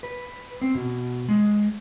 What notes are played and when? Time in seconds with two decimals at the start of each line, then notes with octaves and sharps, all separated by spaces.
0.03 B4
0.62 C4
0.75 B2
1.29 G#3